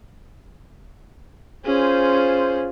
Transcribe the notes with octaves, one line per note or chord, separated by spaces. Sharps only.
C#4 F4 G#4 C5